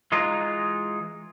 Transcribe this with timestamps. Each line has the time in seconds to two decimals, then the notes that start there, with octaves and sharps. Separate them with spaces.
0.12 E3 G#3 D#4 F4